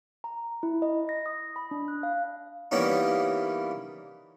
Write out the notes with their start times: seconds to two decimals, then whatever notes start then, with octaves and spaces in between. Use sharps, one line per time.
0.24 A#5
0.63 E4
0.82 D#5
1.09 A#6
1.26 D#6
1.56 B5
1.71 D4
1.88 F#6
2.03 F5
2.71 E3 G3 A#3 B3 C#4 D#4